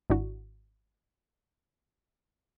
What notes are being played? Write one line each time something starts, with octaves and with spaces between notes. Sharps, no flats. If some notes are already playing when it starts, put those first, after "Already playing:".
G#1 D4 E4 F#4